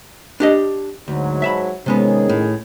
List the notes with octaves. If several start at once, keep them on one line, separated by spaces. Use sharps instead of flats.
D4 G4 D#5
D2 G#2 F#3
E5 A5 B5
C3 D#3 G#3 B3 C#4 G#4
A2